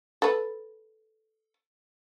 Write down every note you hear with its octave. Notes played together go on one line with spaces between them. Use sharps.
A4 B4